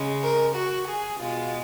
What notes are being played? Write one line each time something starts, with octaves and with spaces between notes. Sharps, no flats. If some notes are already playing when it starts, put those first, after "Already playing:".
Already playing: C#3 G#3
A#4
F#4
G#4
B2 G#3 F4